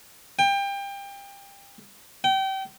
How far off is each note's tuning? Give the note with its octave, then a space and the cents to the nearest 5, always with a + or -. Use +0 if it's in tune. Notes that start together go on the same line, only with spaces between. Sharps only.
G5 +25
G5 -30